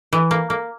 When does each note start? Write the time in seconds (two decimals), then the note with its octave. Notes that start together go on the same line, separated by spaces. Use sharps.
0.13 E3
0.31 A#3
0.50 A#3